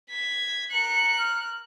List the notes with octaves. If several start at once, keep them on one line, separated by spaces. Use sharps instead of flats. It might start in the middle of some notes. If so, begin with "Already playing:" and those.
G#6 B6
A#4 F#6 C#7
F6